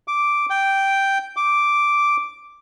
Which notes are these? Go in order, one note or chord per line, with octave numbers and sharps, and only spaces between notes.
D6
G5
D6